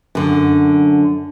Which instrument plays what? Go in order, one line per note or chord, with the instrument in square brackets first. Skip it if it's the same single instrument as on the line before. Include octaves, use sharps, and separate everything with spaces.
[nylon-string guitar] F#2 D3